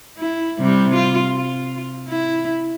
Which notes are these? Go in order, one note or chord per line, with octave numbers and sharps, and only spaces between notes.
E4
C3 G3
F4
F4
E4